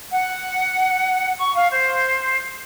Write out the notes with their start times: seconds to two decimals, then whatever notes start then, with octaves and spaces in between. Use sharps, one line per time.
0.11 F#5
1.39 C#6
1.56 F5
1.71 C5